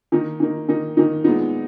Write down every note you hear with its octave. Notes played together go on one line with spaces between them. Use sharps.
D#3 A#3 D#4
D#3 A#3 D#4
D#3 A#3 D#4
D#3 A#3 D#4
A#2 G#3 B3 D#4